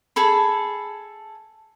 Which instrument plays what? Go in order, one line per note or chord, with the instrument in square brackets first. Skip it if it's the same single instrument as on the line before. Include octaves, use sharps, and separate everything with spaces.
[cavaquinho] G#4 A4 B5